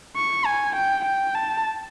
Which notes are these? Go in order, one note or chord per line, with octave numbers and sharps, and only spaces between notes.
C#6
G#5
G5
G5
A5